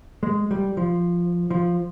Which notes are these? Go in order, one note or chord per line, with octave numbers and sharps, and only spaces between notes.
G#3
G3
F3
F3